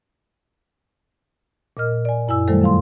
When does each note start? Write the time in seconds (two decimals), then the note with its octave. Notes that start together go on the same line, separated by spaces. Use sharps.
1.77 A#2 A#4 D#5 F6
2.05 D5 G#5
2.28 F#2 E4 G#5 E6
2.48 D#3 F#3 G3 A3 A4 C5
2.62 F2 F5 C6